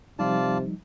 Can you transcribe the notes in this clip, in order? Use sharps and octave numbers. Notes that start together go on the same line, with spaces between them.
C3 F3 G3 D#4 F4 D5 A5